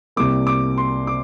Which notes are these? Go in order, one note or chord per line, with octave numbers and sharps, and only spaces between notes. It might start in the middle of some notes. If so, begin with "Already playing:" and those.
C2 C3 G3 A#3 D6
D6
C6
C3 D6